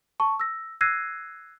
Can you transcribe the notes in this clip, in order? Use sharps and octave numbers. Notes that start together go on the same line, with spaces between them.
A5 C#6
E6 A#6
E6 F#6 G#6 A#6 C7 D#7